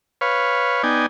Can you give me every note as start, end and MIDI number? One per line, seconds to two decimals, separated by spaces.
0.21 0.83 71
0.21 0.83 73
0.21 0.83 77
0.83 1.06 59
0.83 1.06 63
0.83 1.06 74
0.83 1.06 79
0.83 1.06 80